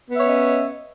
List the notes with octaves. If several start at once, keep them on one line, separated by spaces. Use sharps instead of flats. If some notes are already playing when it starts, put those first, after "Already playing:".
B3 C#4 C#5 D#5 E5